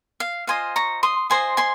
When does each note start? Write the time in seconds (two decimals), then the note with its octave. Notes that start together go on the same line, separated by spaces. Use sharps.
0.20 F5
0.47 F4 C5 D#5 F5 G#5
0.76 A#5 C#6
1.03 C6 D#6
1.30 F4 C5 D#5 G#5 C6
1.57 G#5 C6